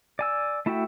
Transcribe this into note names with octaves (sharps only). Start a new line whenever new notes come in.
D5 G#5 E6
A3 E4 F#4 E5 G5